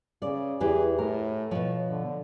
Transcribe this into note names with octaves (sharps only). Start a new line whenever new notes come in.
C#3 D5
E2 E3 G4 G#4
A2 A#4
B2 F3 C#5
D3